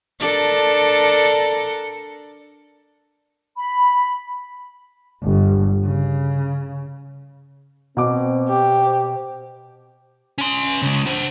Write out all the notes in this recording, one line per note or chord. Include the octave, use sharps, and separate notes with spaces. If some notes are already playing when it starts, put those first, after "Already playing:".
D4 A4 A#4
B5
G1
C#3
B2 C4 D6
G4
C5
C#4 C6
C#3 G#3
D4 C5